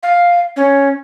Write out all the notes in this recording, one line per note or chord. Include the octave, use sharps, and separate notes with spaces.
F5
C#4